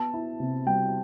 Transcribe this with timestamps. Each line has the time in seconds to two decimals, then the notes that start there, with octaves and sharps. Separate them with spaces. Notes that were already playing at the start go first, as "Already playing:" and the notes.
Already playing: B3 A5
0.14 E4
0.40 C3
0.66 G3 G5